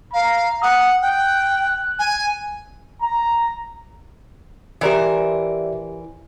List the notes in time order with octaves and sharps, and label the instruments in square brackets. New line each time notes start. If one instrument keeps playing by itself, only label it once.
[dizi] F5 [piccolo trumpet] A#5
[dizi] F#5 [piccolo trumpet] D#6
[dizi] G5 [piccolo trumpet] F#6
[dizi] G#5
[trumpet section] A#5
[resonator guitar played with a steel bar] E3 A#4 C5 [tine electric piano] G4 D5 E5